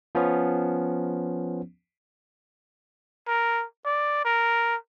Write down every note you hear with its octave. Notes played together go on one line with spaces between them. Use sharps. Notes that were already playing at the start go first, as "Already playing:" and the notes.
F3 B3 C#4
A#4
D5
A#4